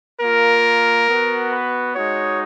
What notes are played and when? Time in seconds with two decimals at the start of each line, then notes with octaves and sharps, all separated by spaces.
0.21 A#3 F4 A#4
1.08 B3 F#4
1.51 B4
1.95 G#3 D#4 F#4 C#5